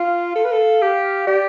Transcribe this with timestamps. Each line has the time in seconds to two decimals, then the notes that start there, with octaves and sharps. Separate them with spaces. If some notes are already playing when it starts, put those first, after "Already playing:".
Already playing: F4 F5
0.35 A4
0.44 B4
0.52 A4
0.82 G4
1.27 G4 D5